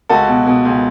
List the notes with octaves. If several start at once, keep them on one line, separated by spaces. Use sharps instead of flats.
C#2 F#4 A4
B2
B2
C#2